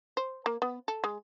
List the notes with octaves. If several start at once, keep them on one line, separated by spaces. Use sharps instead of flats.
C5
A#3
B3
A4
G#3